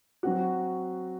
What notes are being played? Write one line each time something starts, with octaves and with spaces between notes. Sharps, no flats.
F#3 C4 F#4